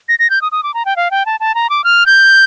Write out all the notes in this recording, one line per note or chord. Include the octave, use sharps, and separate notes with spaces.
A#6
A#6
G6
D#6
D#6
D6
A#5
G5
F5
G5
A5
A5
A#5
D6
F6
G6